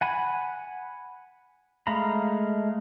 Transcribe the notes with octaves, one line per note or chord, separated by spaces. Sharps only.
F#5 G#5 B5
G#3 A3 F5 A#5 B5